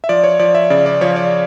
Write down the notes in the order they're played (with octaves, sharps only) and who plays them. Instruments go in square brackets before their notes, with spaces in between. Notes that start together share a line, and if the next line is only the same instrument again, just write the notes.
[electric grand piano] E5
F3 D5
C#5
F3 D5
E5
C#3 D5
D5
F3 C#5
D5